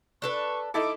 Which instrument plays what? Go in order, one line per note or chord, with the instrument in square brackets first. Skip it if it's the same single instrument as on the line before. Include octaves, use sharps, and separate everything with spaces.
[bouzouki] D4 A4 B4 [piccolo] C#6
[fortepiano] D#4 E4 A4 [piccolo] D6